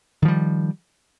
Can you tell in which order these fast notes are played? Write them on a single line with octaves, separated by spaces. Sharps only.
D#3 F3 G3